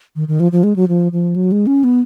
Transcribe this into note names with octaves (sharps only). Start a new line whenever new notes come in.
D#3
D#3
F3
F3
G#3
F#3
F3
F3
F#3
G#3
C#4
B3